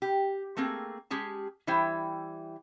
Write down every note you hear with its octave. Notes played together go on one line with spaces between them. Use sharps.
G4
A3 A#3 C4 G#4
G#3 C#4 G4 G#4 A5
E3 G3 E4 C5 G5